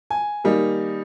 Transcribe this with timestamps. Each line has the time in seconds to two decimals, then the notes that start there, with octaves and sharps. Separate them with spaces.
0.10 G#5
0.44 D#3 G3 A#3 D#4